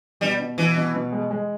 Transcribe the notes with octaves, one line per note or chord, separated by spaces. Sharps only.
B2 G3
B2
B2 E3
B2
B2
G#3
G#3